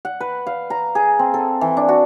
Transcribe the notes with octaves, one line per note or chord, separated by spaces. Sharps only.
F#5
B4
F5
A#5
G#4
C4
A4
E3
D4
F#4